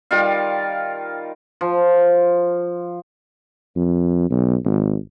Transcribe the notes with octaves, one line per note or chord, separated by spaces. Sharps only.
D#3 G3 F4 F5
F3
F2
B1
G#1